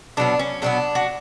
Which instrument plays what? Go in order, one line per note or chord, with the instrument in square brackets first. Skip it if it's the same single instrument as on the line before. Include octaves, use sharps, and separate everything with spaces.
[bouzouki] B2 F#3 B3 D4
C#4
B2 F#3 B3 D4
F#4